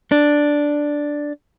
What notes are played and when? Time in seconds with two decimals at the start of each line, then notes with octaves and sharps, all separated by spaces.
0.12 D4